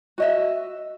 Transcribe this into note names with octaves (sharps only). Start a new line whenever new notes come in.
F#4 D#5 E5